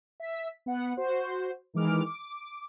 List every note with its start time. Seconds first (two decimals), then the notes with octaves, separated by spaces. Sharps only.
0.20 E5 B6
0.66 B3 F#5
0.97 F#4 C5
1.74 D#3 E3 G#3 D6 F6
2.06 D6